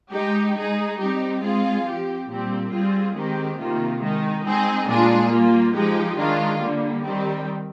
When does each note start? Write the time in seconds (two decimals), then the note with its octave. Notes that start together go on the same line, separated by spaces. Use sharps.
0.12 G#3 D#4 G4
0.55 G#3 D#4 G#4
0.99 G3 C4 D#4 G4
1.42 G#3 C4 F4 G#4
1.85 F3 C4 G4
2.29 A#2 G3 C4 G4
2.72 G3 C4 F4 G#4
3.15 D#3 G#3 C4 G4
3.58 C3 D#3 A#3 F4
4.01 D#3 G#3 D#4
4.44 G#3 C4 D#4 G#4
4.87 A#2 G#3 D4 F4 G#4
5.30 G3 A#3 F4
5.74 F3 G#3 D#4 G4
6.17 D#3 G#3 D4 F4
6.61 D3 G3 A#3
7.04 D#3 G3 C4 G4